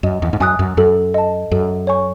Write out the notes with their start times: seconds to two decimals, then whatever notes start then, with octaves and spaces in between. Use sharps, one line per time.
0.03 F#2 D#5
0.22 E2
0.33 G#2
0.40 F#2 G#5 D#6 F#6
0.59 F#2
0.77 F#2 A4
1.14 D#5 A5
1.51 F#2 A4
1.87 C#5 G#5 C#6